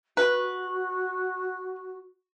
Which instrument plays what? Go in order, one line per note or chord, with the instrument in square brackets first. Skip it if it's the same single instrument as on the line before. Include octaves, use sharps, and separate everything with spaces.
[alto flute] F#4 [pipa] B4